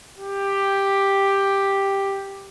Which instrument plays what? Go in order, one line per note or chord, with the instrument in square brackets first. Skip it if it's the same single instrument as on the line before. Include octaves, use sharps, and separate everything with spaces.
[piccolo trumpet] G4